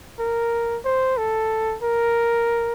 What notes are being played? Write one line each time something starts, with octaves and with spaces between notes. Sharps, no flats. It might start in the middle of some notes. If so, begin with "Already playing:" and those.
A#4
C5
A4
A#4